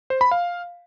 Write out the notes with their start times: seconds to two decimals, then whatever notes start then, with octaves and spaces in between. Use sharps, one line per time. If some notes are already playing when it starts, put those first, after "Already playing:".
0.10 C5
0.21 B5
0.31 F5